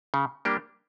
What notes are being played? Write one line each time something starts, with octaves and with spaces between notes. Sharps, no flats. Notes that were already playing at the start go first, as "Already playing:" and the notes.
C#3
G3 A#3 D4 G4